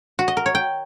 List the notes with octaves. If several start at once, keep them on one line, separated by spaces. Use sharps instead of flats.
F#4
D#5
A#4
C#5
G5